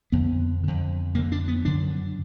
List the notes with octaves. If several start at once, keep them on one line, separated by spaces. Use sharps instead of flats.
F2 D3 B3
F2 D3
F2 D3 A#3
D4
B3
F#2 D3 D4